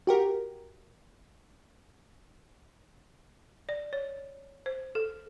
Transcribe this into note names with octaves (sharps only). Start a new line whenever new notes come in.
F#4 G4 A#4
D5
C#5
C5
A4